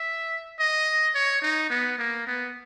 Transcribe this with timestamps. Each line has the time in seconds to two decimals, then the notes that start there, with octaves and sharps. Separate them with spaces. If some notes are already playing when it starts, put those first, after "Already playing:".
Already playing: E5
0.59 D#5
1.15 C#5
1.42 D#4
1.70 B3
1.98 A#3
2.27 B3